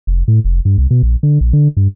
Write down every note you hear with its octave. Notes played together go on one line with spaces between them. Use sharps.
F1
A2
F1
G2
C2
B2
A#1
D3
A#1
D3
G2